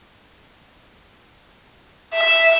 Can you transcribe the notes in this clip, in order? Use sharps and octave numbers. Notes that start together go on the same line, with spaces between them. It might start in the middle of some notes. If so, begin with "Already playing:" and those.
E5